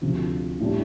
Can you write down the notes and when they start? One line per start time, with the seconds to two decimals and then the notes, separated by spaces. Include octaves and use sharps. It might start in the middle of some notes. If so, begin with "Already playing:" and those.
0.02 D2 C3 F3
0.60 A2 G3 D4